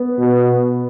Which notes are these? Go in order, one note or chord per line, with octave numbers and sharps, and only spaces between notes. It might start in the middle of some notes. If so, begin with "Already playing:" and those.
Already playing: B3
B2